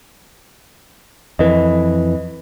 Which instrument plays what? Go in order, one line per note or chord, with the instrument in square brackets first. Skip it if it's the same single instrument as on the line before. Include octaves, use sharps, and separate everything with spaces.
[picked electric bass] F2 E3 [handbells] B4 D#5